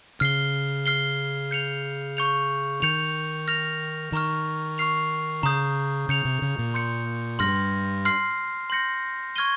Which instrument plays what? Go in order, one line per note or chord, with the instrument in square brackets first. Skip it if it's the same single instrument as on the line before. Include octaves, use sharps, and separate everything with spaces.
[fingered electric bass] C#3 [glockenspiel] F6 C7 G7
[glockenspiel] F6 C7 G7
G6 C#7 F7
C#6 G6 C#7 F7
[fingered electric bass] D#3 [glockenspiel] G6 C#7 F7
[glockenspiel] F6 A#6 F7
[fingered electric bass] D#3 [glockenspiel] A#5 C#6 F6
[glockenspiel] C#6 F6 C7 F7
[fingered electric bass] C#3 [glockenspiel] A#5 D#6 G6
[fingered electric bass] C#3 [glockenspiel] G6 C#7 F7
[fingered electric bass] C3
C#3
A#2
[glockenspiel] C6 G6 C#7
[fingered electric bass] G2 [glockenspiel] C6 F6 A#6
[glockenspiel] C6 F6 C7
C6 G6 A#6 C#7
C#6 F6 G#6 D#7 G7